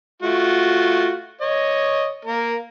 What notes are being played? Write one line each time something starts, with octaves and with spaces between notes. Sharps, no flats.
A3 F4 F#4
C#5 D#5
A#3 A#4